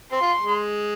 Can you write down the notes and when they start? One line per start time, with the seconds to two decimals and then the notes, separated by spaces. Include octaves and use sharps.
0.12 C4 C6
0.22 F4
0.42 G#3